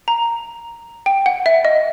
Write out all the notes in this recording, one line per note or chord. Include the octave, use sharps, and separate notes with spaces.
A#5
G5
F#5
E5
D#5